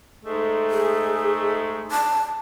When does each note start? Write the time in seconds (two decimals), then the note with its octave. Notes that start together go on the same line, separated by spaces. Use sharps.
0.23 G#2 G#3 A3
0.71 G#4
1.91 A5